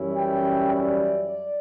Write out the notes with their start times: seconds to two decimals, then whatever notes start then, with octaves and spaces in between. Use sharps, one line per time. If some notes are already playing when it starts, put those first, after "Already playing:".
Already playing: F#2 E3 G3 C#4 E4
0.16 G5
0.71 D5
1.25 D5